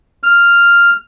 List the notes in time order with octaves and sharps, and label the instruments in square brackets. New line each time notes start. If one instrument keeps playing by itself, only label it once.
[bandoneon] F6